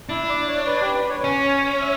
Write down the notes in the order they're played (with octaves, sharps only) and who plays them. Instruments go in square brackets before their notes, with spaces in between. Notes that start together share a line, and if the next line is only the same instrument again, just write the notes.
[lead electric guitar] D4 [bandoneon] E4
[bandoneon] D5
C#5
B4
G4
B4
C#5
[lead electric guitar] C#4 [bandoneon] C#5
[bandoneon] E5